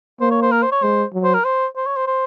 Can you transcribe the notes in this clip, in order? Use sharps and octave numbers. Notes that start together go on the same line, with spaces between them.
A#3 C5
C#5
C5
A#4
C5
C#5
G#3 C5
F#3
C5
A#4
C5
C5
C#5
C5
C5